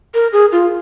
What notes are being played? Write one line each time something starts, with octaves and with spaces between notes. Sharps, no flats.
A#4
G#4
F4